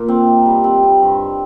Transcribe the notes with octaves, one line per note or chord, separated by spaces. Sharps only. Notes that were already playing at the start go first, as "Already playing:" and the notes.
Already playing: A#2
C4
D#4
G3
C4
C4
G2